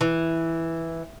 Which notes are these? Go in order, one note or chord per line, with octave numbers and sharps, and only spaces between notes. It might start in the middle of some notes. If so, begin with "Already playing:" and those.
E3